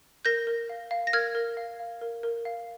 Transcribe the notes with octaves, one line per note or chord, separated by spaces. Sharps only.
A#4 G6 A#6
A#4
F5
F5
A#6
A#4 F6 G#6
A#4
F5
F5
A#4
A#4
F5